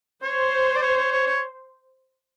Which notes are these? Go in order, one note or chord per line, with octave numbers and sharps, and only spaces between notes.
C5 C#5
D5
C#5
C#5
C#5
C#5